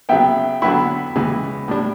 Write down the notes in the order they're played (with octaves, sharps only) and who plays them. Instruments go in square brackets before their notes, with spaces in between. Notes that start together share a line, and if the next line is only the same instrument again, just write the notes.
[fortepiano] C#3 F#3 B3 [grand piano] E5 G5
[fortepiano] D3 F#3 B3 E4 [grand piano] G5 B5
[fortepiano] C#2 C#3 E3
A2 G3 D4